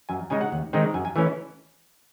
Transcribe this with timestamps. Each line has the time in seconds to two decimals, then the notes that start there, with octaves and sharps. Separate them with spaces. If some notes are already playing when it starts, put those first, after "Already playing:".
0.09 F#2 G#5
0.30 C#3 G#3 D#4 G#5
0.41 F#5
0.52 D#2
0.73 D#3 G#3 C4 D#4
0.94 F#2 G#5
1.05 G#5
1.16 E3 A3 C#4 E4 G#5